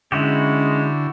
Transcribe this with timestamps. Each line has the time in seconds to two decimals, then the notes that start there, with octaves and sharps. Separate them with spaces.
0.12 D3 G#3 C#4 E4 F#4 G4